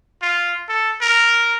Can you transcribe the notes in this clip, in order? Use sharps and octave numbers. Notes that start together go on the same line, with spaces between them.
F4
A4
A#4